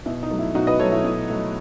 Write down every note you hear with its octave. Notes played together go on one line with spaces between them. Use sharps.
B2 E4
D#4
F#3 A3
E4
B2 D#4 F#4
B4 D#5
F#3 A3 A4 C#5
E4
B2 E4
F#3 A3